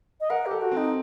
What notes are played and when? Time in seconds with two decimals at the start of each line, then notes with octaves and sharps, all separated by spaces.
0.20 D#5
0.30 A#4 F#5
0.45 G4
0.51 A4
0.61 F#4
0.71 C4 D#4